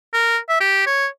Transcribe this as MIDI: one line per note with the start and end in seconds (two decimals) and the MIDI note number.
0.14 0.38 70
0.49 0.59 76
0.61 0.86 67
0.87 1.07 73